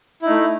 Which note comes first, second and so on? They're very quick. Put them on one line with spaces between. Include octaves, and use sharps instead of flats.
E4 D#4 A3